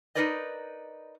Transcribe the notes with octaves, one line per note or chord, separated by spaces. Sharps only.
D#4 E4 A#4 B4 D5 D#5